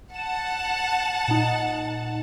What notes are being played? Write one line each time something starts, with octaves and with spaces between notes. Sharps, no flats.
F#5 A5 E7
A#2 D#4